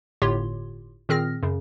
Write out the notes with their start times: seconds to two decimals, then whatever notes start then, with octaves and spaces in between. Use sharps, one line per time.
0.22 G1 A2 F4 G4 C#5 C6
1.09 A#2 D#3 C4 G#4 F6 A#6
1.43 F#2 C#3